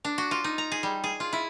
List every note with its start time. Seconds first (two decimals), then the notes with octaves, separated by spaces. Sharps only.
0.05 D4
0.18 F#4
0.31 F4
0.44 D#4
0.58 A#5
0.72 G#4
0.83 G3
1.04 G#4
1.20 F4
1.33 E4